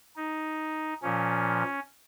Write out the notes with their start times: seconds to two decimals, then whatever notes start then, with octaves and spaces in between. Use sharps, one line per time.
0.16 D#4
1.02 A#2 F3 C#4